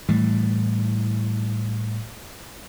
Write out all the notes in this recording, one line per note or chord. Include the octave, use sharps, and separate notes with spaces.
A2 E3 G3